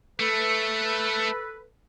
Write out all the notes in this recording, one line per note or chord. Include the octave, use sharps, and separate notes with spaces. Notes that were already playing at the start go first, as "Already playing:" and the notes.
A3 A4 B4